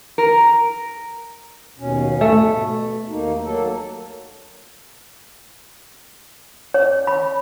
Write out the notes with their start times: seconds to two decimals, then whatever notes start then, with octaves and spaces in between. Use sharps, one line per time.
0.18 A#4
1.78 D#2 B2 C#4
2.21 G#2 F3 A3
2.40 B2
3.09 D#2 A#3 D#4
3.45 F#3 A#3 A4
6.74 C#5
7.07 B5